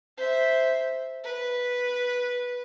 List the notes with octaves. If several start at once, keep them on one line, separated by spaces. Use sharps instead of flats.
C5 E5
B4